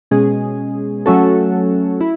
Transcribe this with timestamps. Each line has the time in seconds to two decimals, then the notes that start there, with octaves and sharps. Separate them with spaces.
0.11 B2 G#3 C#4 G#4
1.06 F#3 A3 C#4 F#4 A4
2.01 E4